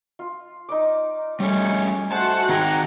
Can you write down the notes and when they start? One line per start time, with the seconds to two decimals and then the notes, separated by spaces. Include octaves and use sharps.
0.19 F4
0.69 D#4 D5 D6
1.40 G3 A3 C#4
2.12 A3 F#4 G#4 C5 F#5 A5
2.49 D#3 D#4 G#4 E5 G5 G#5 A#5